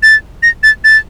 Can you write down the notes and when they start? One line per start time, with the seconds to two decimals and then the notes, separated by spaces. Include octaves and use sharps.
0.03 A6
0.43 A#6
0.63 A6
0.84 A6